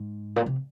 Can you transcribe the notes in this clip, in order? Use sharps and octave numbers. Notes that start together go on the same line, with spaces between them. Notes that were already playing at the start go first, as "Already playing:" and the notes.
Already playing: G#2
A#2
C3